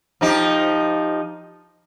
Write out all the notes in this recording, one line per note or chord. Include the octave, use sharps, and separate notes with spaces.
F3 D#4 G4